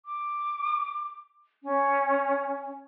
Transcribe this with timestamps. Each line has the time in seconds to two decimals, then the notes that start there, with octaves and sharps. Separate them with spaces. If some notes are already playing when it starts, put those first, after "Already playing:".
0.05 D6
1.63 C#4